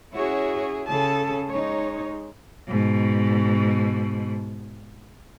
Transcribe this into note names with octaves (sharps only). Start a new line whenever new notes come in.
C#4 E4 F#4 G#4 C#5
C#3 G#4 A4 A5
G#3 D#4 C#5
G#2 B2